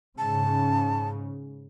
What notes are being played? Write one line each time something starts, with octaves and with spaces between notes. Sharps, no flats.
G#2 C#3 A5